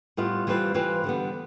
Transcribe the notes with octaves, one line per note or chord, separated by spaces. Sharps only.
A2 G3 B3 F4
E3 G3 C4 F4 B4
E3 G3 C4 F4 B4
D3 G3 B3